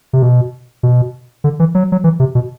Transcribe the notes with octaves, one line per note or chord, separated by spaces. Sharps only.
C3
B2
B2
D3
E3
F#3
F#3
E3
C3
B2